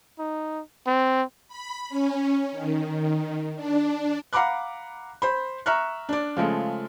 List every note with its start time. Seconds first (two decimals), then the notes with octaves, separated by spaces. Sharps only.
0.19 D#4
0.87 C4
1.48 B5
1.89 C#4
2.52 D#3
3.55 D4
4.33 F5 F#5 A#5 B5 D6 F#6
5.22 C5 B5
5.66 E5 A#5 C#6 F6 F#6
6.09 D4 D5
6.37 C#3 F3 G#3 A3